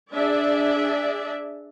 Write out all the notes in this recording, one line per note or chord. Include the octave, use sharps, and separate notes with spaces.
D4 G#4 D5 E5